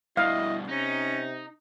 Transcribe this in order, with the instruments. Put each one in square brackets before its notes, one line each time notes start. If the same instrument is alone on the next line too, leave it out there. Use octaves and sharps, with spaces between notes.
[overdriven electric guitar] G2 B2 [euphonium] E4 [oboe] D#5 [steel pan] F5
[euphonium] C3 [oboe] C#4 [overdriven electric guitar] D#4